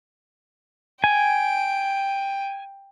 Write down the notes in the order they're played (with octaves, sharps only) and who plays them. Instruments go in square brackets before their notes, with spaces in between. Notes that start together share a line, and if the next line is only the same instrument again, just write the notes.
[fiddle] G5 [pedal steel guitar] G#5